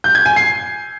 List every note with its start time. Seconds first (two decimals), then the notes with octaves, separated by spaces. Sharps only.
0.04 G6
0.15 G#6
0.26 G#5
0.36 C7